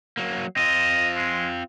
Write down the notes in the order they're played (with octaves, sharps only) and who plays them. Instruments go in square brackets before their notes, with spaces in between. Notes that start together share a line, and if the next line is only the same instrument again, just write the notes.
[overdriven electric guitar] F#3 A#3
[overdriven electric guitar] C4 F4 [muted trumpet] D#5
[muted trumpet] G#3